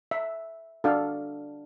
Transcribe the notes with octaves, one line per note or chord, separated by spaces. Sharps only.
E5
D4 F#4 A4 F5